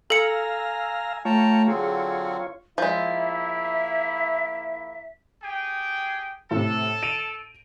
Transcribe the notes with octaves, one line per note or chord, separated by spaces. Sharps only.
A4 F5 G#5 A#5 E6 C#7
A3 F4 C#5 G5 A5 A#5
D3 F#3 C4 G#4
F3 G#3 A#3 E4 E5
G4 G#4 G5
A2 C3 A4
D7 D#7 F7